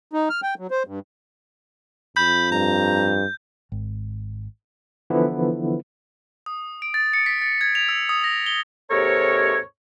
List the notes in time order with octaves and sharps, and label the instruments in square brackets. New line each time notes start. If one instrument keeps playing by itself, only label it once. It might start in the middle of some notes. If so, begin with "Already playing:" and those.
[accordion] D#4
F6
G5
F#3
C5
G2
[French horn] F2 [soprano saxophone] B5 [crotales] G6
[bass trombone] G2 [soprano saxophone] A#5
[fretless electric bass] G#1
[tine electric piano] D3 E3 F3 B3 E4
[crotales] D#6
D7
A6
C#7
B6
A6
G#6
F7
E6
D#6
A#6
G7
[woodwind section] D#2 G#2 C3 A4 A#4 C#5